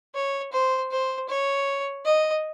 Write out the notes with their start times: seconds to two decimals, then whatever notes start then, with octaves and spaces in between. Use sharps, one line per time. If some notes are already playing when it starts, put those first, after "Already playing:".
0.15 C#5
0.53 C5
0.91 C5
1.29 C#5
2.05 D#5